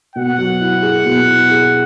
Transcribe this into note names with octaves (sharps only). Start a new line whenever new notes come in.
B2 F#5
F#3
E4
G#4
B2
E4
G#4